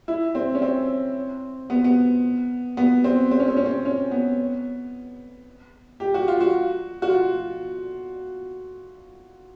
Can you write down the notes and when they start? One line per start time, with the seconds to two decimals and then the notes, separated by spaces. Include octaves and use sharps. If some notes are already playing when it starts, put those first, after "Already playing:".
0.08 E4
0.35 C4
0.54 C#4
0.62 C4
1.70 B3
1.84 B3
2.77 B3
3.04 C4
3.31 C4
3.40 C#4
3.48 C4
3.57 C#4
3.66 C4
3.85 C#4
4.11 B3
6.00 G4
6.14 F#4
6.28 F4
6.41 F#4
7.02 F#4
7.09 F4